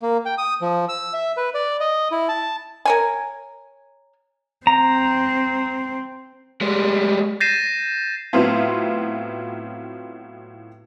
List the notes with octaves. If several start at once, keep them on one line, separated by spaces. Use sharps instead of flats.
A#3
G5
D#6
F3
E6
E5
B4
D5
D#5
E4
A5
A#4 C#5 G#5
C4 A#5
G3 G#3
G6 A6 A#6 C7 D#7 E7
A2 F#3 B3 C4 E4 F4